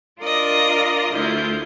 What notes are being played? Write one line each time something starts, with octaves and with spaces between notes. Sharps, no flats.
D4 F4 A#4 D5 D#5 A#5
D2 D4 E4 F4 G6